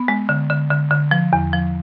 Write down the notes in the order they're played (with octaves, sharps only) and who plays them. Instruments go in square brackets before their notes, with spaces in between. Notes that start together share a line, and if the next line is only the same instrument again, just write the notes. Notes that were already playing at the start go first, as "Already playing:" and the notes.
Already playing: [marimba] B3
G#3
D3
D3
D3
D3
F3
E2
F3